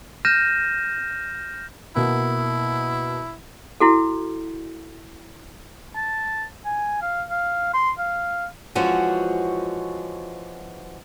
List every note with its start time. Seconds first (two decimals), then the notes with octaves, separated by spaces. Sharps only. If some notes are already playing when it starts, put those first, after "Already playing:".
0.25 F6 G6 A#6 D#7 E7
1.96 B2 A#3 E4
3.80 E4 F#4 A4
5.96 A5
6.65 G#5
7.02 F5
7.30 F5
7.74 C6
7.99 F5
8.75 E3 F3 G#3 C#4 F#4